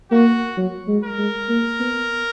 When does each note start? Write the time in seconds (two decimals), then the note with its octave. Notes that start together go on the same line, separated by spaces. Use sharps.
0.11 A#3 F#4
0.57 F#3
0.88 G#3
1.04 A#4
1.18 G#3
1.49 A#3
1.80 B3